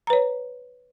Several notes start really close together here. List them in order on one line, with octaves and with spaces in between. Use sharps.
A#5 B4 C#5